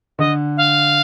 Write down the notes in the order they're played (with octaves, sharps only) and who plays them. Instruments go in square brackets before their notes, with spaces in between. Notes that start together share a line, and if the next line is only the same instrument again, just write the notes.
[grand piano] D3 [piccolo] D#5
[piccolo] F5